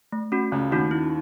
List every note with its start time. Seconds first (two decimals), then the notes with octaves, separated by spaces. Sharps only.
0.12 A3
0.32 C#4 F#4
0.52 C#2 C#3 A3
0.71 D#2 D#3 C#4 F#4
0.91 E4